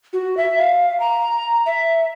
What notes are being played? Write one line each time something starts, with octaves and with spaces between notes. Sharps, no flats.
F#4
E5
F5
A#5
E5